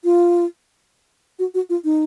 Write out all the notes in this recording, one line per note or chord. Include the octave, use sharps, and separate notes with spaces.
F4
F#4
F#4
F4
D#4